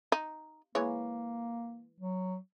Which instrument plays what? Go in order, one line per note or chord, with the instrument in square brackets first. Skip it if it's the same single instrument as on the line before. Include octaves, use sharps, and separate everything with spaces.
[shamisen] D#4
[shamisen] E3 G#3 C#5 [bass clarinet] A#3
[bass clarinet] F#3